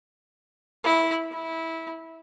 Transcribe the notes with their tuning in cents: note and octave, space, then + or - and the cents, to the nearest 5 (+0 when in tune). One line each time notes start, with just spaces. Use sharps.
E4 -10
E4 -15